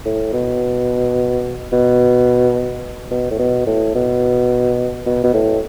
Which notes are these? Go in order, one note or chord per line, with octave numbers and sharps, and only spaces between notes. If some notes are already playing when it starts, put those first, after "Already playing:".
A2
B2
B2
B2
A2
B2
A2
B2
B2
B2
A2